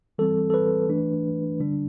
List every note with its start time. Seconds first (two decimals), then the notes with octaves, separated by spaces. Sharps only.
0.18 E3 G3 C4 A4
0.50 A4
0.54 B4
0.89 E3 A3 D4
1.60 D3 G3 D4